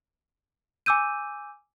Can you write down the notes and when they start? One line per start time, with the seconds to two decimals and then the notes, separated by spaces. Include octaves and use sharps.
0.86 G#5 D6 E6 G6 D#7